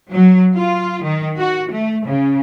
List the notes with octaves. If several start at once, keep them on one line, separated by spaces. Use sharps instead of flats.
F#3
F4
D#3
F#4
A3
C#3